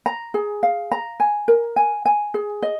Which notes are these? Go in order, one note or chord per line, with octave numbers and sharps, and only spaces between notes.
A#5
G#4
F5
A#5
G#5
A#4
G#5
G#5
G#4
D#5